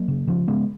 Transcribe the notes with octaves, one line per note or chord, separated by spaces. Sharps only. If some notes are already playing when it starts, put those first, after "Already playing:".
Already playing: F#3 A#3
C#3
C#3 F3
C#3 G#3 B3